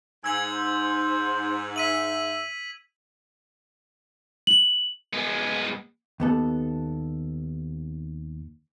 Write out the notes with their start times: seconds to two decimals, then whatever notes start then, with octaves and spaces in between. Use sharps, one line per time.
0.24 G#2 G#5 E6 G#6 F#7
0.51 C5
1.76 E5 B6 D#7 F#7
4.47 F#7
5.14 G#3 B3
6.20 D#2 B3 A4